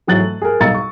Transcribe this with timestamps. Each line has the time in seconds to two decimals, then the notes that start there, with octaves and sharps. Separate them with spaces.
0.07 G#2 E3 F#3 F#6 A6 F#7
0.19 A3
0.42 G#4 A#4
0.60 B1 G3 F5 A#5 A6 C#7
0.74 C#6